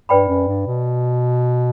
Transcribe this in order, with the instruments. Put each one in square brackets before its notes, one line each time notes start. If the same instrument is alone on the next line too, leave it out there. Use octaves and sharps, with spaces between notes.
[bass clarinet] G2 [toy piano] B4 D5 G5 B5
[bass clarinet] F#2
G2
B2